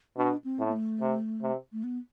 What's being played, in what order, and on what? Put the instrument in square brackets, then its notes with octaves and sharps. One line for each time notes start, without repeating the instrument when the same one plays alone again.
[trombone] B2 [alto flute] D4
[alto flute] C4
[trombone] A2
[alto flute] B3
A3
[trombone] C3
C3
[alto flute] A3
B3